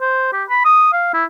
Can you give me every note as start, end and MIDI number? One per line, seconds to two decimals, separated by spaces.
0.01 0.29 72
0.33 0.44 67
0.49 0.63 83
0.65 0.90 87
0.93 1.13 77
1.14 1.24 64